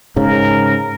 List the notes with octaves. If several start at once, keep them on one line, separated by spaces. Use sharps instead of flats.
G#2 C#3 A#4